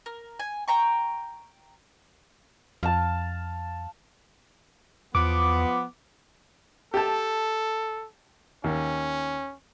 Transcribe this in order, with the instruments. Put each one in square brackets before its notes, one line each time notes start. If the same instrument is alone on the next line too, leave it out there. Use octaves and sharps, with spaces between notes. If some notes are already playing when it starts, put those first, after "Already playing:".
[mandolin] A#4
G#5
G5 A#5 C#6
[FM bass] F2 [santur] F5 A5
[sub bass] E2 [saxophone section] F3 B3 [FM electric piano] D6
[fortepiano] G4 A5 [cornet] A4
[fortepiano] D#2 [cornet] C#4